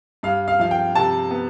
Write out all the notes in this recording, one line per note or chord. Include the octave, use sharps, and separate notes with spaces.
G2 F5
F5
F3 F5
G5
C3 A5
B3